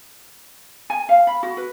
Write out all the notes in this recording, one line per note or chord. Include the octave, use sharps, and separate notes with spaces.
G#5
F5
B5
F#4
B4